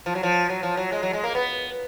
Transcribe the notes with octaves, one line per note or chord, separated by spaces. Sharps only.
F3
F#3
F3
F#3
F3
F#3
G#3
F#3
G#3
A#3
B3